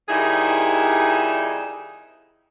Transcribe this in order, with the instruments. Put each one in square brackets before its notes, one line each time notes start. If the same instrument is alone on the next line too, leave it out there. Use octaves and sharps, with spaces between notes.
[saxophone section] F2 D#3 G3 D#4 E4 G#4